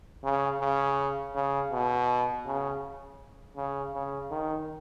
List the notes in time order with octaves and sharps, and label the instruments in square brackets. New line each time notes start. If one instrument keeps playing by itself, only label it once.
[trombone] C#3
C#3
C#3
B2
C#3
C#3
C#3
D#3